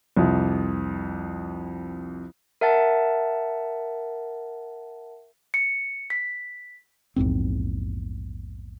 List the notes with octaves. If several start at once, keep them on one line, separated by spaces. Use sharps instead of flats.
C2 F2
A#4 E5 F#5 A5 A6
C#7
B6
A#1 E2 G#2 C4